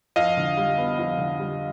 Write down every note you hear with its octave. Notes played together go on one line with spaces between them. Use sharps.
F2 D#5 F5
D3
G3
B3
F2
D3
G3